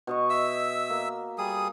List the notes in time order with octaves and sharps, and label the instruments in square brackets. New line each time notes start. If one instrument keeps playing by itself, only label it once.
[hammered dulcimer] B2 D#5 C#6
[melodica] E5 E6
[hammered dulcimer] A#3
[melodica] G3 G#4 D#6